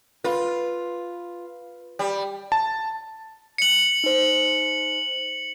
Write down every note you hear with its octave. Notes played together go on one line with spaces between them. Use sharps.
F4 B4
G3
A5
C#7 F#7
D#4 C5